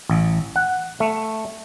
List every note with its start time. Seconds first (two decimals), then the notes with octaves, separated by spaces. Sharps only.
0.10 A1
0.56 F#5
1.00 A3